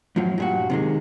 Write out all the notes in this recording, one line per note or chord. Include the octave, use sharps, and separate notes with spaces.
F#2 A2 F3 F#3
G2 A#2 F#4
C3 D#3 G#3